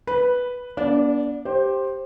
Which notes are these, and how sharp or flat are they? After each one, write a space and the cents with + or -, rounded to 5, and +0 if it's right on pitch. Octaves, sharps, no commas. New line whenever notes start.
B4 +0 B5 -10
B3 -40 D4 -30 D5 +0
G4 +0 C5 +15